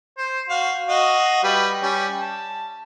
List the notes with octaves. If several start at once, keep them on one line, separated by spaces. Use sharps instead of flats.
C5
F#4 F5
F#4 D#5 F5
G3 B4
G3 C#4
A5